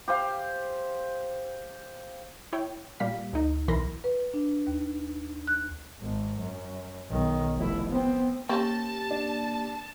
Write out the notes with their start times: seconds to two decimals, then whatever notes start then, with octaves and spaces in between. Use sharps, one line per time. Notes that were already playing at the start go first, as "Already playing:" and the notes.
0.08 G4 C5 F5
2.53 E4 C#5 G5
3.00 A#2 G3 F5 B6
3.33 D2 D#4
3.68 B1 E3 A#4 B5 C6 A#6
4.04 B4
4.34 D4
4.67 D#2
5.47 F#6
6.01 G#1
6.40 F#2
7.10 B1 D#3
7.57 F1 E4
7.89 B3 C4
8.49 A#3 C4 C#4 G4 A5
9.11 D4